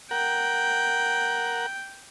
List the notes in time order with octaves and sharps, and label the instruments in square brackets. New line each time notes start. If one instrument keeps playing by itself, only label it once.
[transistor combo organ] A#4 F#5 [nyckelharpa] G5